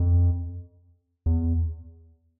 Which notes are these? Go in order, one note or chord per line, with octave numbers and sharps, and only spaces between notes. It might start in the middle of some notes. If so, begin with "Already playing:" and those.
Already playing: F2
E2